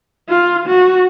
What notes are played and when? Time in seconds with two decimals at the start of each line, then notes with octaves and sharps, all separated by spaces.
0.28 F4
0.66 F#4